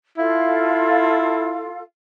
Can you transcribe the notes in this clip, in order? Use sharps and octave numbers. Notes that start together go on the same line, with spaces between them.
E4 F4 A4 F5